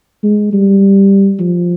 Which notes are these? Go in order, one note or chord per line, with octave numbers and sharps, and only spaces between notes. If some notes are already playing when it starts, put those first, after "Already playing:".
G#3
G3
F3